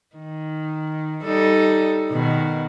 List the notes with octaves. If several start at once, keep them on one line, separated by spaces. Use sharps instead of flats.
D#3
G3 D#4 A4
B2 D#3